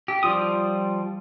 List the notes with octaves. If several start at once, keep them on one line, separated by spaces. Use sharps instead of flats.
G4
F3 G3 F4 D#6